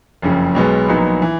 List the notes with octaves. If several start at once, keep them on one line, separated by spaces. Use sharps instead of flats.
F#1 F2 C#3
B1 B2 G#3 B3
A#1 A#2 F#3 B3 D#4
E3